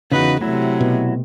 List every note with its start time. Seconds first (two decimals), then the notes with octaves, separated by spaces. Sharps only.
0.12 E2 C#3 D#4 F#4 B4
0.41 C3 F#3 A3 E4
0.81 B2